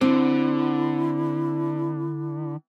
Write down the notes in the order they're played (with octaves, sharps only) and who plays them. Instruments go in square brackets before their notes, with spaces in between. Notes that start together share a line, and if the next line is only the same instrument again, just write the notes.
[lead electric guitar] D3 [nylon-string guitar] C4 [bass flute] E4